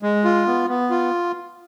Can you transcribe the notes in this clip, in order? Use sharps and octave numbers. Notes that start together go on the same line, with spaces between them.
G#3
F4
B3
B3
F4